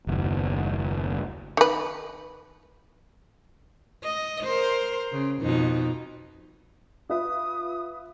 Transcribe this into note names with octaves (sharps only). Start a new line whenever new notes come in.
F#1 D#2
D#3 B4
D#5
A#4 C5
C#3
F2 B2 D#4
F4 B4 E5 D#6